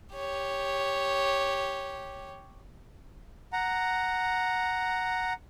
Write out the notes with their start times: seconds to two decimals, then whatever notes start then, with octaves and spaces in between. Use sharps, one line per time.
0.15 G4 C#5
3.53 F#5 A#5